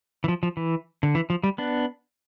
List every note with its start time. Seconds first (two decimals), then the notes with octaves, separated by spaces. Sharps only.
0.24 E3
0.28 F3
0.43 F3
0.57 E3
1.03 D3
1.15 E3
1.30 F3
1.43 G3
1.58 B3 D4